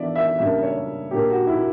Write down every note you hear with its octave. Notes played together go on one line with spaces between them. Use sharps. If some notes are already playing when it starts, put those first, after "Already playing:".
Already playing: E3 B3 D4 D5 E5
E5
C#3 G3 A#3 D4 E5
C#5
A#2 A#3 D4 G4
F#4
E4